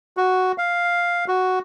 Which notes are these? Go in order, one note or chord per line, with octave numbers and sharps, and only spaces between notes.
F#4
F5
F#4